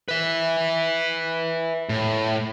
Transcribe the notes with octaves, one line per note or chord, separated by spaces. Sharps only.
B4 E5
A2